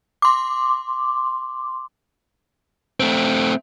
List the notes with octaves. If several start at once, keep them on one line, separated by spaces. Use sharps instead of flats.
C6 D6
A3 C4